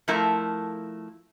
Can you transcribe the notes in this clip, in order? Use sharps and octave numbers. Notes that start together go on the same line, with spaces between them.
F3 A3 E4 A#4